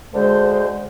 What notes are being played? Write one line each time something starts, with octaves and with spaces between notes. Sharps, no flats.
D2 D3 G#3 C5